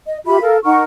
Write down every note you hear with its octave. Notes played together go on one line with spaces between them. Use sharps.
D#5
F4 G4 E5 B5
A4 A#4 F5
D#4 A#4 F#5 C#6